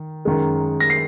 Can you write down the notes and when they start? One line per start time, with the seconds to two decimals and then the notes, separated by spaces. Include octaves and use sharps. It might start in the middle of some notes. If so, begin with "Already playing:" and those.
Already playing: D#3
0.25 F#2 D#3 G#3
0.80 A#6
0.90 C7